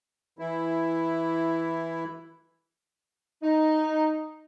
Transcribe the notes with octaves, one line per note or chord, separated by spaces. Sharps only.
E3 E4
D#4